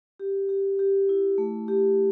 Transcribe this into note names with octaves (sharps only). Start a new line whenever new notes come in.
G4
G4
G4
E4
A3
G4